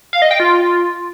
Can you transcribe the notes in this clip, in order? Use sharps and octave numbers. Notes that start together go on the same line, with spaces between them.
F5
D#5
G5
F4